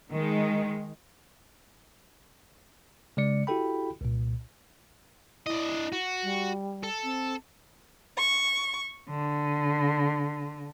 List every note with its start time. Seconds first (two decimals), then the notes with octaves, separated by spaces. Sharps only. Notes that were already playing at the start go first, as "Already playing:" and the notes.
0.11 D#3 G#3
3.17 C#3 G#3 D5 C#7
3.47 E4 F#4 G4 A4 G5 B5
4.01 C2 A#2
5.46 D4 E4 D#5
5.92 F#4
6.23 G3
6.83 A4
7.04 C4
8.17 C#6
9.09 D3